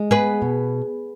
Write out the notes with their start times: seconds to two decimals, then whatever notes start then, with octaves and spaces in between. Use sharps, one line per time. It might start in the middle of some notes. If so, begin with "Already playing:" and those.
Already playing: G#3
0.11 B3 G#4 B4
0.42 B2